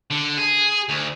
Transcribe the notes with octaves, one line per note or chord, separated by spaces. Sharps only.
D3
G#4
D2